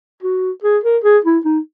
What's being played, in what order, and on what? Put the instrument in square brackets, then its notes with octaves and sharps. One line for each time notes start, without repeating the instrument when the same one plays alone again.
[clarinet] F#4
G#4
A#4
G#4
E4
D#4